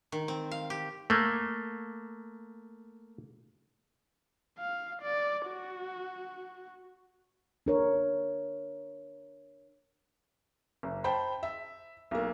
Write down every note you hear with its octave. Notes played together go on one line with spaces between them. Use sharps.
D#3
C4
F5
G4
A3 A#3
F5
D5
F#4
D4 A#4 C#5
F#1
C5 G5 A5 B5
E5
B1 A#3